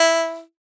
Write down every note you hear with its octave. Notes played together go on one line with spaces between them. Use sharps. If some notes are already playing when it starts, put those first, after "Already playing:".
Already playing: E4